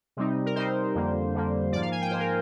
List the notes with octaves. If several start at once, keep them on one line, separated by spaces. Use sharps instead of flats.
C3 G3 C4 D#4
A#4
C3 G3 C4 D#4 C5
F2 D3 G3 A#3
F2 D3 G3 A#3
G#2 F3 A#3 D5
F5
G#5
G5
G#2 F3 A#3 C5
A#4